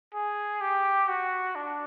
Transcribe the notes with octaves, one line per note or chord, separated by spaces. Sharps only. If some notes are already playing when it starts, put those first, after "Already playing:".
G#4
G4
F#4
D4